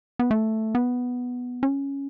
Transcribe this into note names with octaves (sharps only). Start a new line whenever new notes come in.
B3
A3
B3
C#4